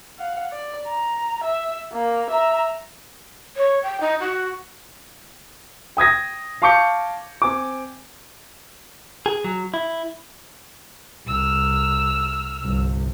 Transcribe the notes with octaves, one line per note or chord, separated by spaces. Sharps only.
F5 F#5
D5
A#5
E5
A#3
E5 A#5
C#5
G5
D#4
F#4
G5 D#6 G#6 A#6
F5 A5 C#6 D6 G6 C#7
C4 G#5 D6
G#4
F#3
E4
C2 E6 F6
G1 C2